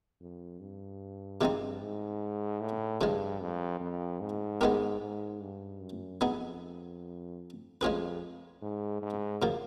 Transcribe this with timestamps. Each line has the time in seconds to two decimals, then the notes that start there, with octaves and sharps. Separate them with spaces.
0.21 F2
0.60 G2
1.41 C3 F3 G#3 C4 D#4
1.81 G#2
2.61 A2
3.01 G2 C#3 F3 G#3
3.40 F2
3.81 F2
4.20 G#2
4.61 G#3 B3 D#4 G4 A#4
5.01 G#2
5.41 G2
5.80 F#2
6.21 F2 B3 D#4 G#4
7.81 F2 G#3 C#4 F4 G#4 B4
8.62 G#2
9.02 G#2
9.42 C#3 F3 A#3